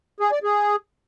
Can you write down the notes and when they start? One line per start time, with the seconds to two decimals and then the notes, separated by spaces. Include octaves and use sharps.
0.20 G#4
0.32 D5
0.43 G#4